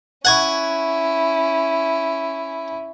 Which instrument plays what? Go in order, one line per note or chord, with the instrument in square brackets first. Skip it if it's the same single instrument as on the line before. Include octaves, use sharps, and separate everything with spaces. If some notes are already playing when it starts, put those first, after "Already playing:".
[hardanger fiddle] C#4 E4 [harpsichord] F#5 G#5 C#6